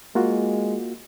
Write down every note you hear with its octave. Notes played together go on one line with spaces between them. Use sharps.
G#3 A#3 F4 F#4